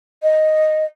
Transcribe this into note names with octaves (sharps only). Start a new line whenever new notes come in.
D#5